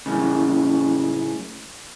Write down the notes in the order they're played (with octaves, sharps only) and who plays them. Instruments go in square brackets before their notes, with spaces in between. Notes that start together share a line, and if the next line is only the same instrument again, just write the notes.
[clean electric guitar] F#2 A2 C#3